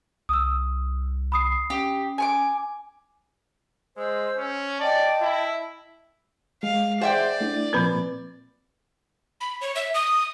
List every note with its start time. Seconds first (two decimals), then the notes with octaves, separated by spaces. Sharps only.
0.29 C2 D#6 E6
1.32 B5 D#6 C7
1.70 C#4 G4
2.18 G#5 C#6 D6
3.97 G#3 C5 E6
4.37 C#4
4.80 D5 D#5 G5 A5
5.22 E4
6.63 G#3 F5
7.01 G#4 C5 D5 E5 F#5 G5
7.41 A3 D4 E4
7.73 A#2 F3 A#3 C4 B4 B5
9.41 B5
9.61 C#5
9.75 E5
9.94 D#6